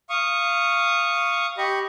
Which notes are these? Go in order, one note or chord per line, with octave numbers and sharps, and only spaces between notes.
F5 C#6 D#6
G4 D#5 B5 C#6